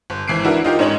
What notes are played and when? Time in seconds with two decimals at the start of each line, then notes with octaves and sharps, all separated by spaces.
0.10 G1
0.28 G#1 E3 C7 D7
0.44 D4 E4 F#4 A#4 B4
0.64 D#4 F4 G4 A#4
0.79 G#2 C#4 D#4 C#5 F#7